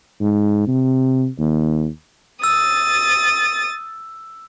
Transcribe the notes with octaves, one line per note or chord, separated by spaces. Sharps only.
G#2
C3
D#2
D#6 E6 A6